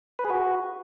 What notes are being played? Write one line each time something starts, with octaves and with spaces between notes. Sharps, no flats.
B4
G#4
F#4